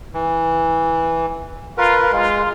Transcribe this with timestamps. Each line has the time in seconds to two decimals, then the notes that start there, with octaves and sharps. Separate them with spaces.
0.14 E3
1.78 F4 A#4 B4
2.12 G#3 F4